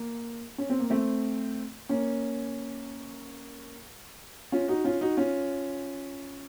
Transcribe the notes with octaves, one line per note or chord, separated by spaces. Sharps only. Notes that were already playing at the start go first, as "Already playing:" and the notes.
Already playing: A#3
C#4
C4
A#3
A3 C4
A#3 C#4
C#4 F4
D#4 F#4
C#4 F4
D#4 F#4
C#4 F4